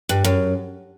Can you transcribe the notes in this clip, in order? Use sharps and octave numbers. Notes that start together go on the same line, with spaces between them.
G2
F#2